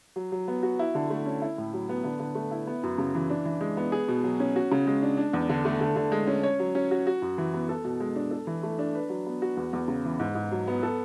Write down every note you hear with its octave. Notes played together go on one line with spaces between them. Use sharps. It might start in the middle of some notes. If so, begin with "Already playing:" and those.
F#3
F#3
B3
F#4
E4
D3
A3
C#4
E4
A2
F#3
B3
D3
D3
A3
E4
B3
F#2
C#3
E3
D4
E3
G#3
B3
G#4
B2
F#3
C#4
F#4
C#3
G#3
D4
D4
E2
D3
A3
D3
D3
G#3
C#4
C#5
F#3
C#4
F#4
F#4
F#2
E3
B3
A4
B2
G#3
D4
A4
E3
A3
D4
B4
F#3
B3
F#4
E2
E2
C#3
E3
G#2
G#2
F#3
B3
A4